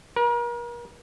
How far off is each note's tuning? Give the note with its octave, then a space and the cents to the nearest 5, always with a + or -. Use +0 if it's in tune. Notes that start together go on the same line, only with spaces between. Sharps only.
A#4 +40